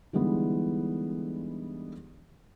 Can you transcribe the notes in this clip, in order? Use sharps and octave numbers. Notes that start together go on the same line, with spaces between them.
D3 E3 G3 G#3 B3 D#4